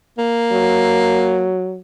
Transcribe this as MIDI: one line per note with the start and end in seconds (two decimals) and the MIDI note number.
0.18 1.53 58
0.52 1.79 54